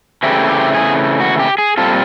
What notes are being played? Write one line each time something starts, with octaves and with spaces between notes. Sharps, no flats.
C#3 E3 A3 C4 E4 G4
G4
G#4
F#4
G4
G#4
A#2 G3 C4 F4 A4